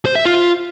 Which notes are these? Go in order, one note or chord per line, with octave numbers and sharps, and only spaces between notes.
C5
E5
F4